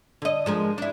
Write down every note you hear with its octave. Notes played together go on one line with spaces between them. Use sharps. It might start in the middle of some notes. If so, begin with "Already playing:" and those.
D3 D#5
F3 G#3 A#4
D4 E4